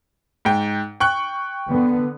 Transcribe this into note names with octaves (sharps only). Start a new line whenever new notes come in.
G#2 G5
G5 C#6 F#6
D3 B3